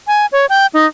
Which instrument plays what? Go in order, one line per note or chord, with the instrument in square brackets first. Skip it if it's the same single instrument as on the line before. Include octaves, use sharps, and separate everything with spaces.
[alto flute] G#5
C#5
G5
D#4